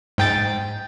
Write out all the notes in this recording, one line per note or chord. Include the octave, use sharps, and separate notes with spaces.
G#2 G5 A6